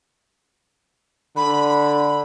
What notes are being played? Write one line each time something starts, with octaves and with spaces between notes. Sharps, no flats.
D3 B5